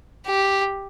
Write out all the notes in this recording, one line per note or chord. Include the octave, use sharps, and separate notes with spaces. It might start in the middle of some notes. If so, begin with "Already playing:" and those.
G4